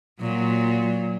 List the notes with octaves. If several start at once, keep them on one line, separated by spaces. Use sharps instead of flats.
A#2 F#3